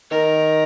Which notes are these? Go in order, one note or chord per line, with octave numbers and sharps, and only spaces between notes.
D#3 A#4